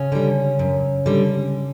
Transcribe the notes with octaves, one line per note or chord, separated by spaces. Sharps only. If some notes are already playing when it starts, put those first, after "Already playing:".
Already playing: C#3 C#4
D3 G3
F#2
D3 G3